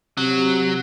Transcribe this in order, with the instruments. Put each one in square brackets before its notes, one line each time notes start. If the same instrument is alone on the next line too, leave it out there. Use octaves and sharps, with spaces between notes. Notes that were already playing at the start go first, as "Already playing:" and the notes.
[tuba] C3 [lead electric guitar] F#3